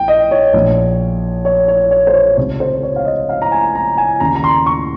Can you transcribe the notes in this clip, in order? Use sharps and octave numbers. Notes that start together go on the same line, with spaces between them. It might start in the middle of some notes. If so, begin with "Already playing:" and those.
Already playing: A#1 G5
D#5
C#5
A#1 A#2
C#5
C#5
C#5
C5
C#5
C#2 C3 D#3 C#5
C5
C#5
F5
D#5
F5
A#5
G#5
A#5
G#5
D#2 C#3 A#5
A#5
C6
C#6